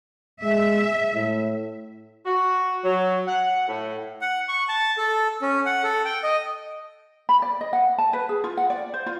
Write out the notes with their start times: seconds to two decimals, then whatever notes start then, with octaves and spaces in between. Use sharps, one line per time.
0.43 G#3 E5
1.14 A2
2.26 F#4
2.84 F#3
3.26 F#5
3.67 A2
4.21 F#5
4.49 C#6
4.69 A5
4.98 A4
5.42 C#4
5.66 F#5
5.84 A4
6.05 G5
6.23 D#5
7.29 B5
7.42 D5
7.61 D#5
7.73 F#5
7.98 A5
8.13 B4
8.29 G#4
8.44 F4
8.57 F#5
8.70 D5
8.94 C5
9.06 F4